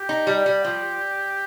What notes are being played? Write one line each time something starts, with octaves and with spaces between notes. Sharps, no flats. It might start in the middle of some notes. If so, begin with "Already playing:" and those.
Already playing: G4
D#4
G3
G3
F3